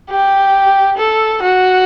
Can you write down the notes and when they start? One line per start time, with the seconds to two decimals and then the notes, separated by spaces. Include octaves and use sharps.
0.10 G4
0.97 A4
1.42 F#4